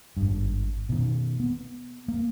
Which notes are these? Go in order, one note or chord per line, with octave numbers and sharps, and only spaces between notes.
G#1 G2
B2 D#3
B3
A#3